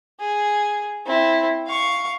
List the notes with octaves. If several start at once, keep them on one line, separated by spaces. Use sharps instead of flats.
G#4
C4 E4
F5 C#6